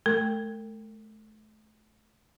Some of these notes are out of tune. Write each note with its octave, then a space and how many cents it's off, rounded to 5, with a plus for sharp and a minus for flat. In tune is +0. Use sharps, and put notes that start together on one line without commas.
A3 -35 A#4 -45